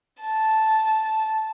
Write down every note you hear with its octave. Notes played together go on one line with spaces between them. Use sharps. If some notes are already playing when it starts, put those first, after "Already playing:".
A5